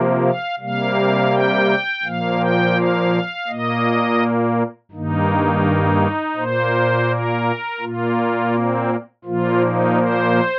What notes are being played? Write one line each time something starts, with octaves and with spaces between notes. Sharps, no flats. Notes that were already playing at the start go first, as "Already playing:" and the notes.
Already playing: C3 F3 A#3
F5
C3 G3 A#3 F5
G5
A#2 F3 A#3 F5
G5
F5
A#2 A#3 D#5
G2 D#3 A#3 D#4
A#2 A#3 C5
A#4
A#2 A#3 F4
C4
A#2 F3 A#3 F4
D#4
C5